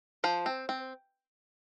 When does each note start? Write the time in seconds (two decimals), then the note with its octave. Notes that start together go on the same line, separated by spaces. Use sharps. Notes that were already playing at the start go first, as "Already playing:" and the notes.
0.24 F3 C5
0.46 C4
0.69 C4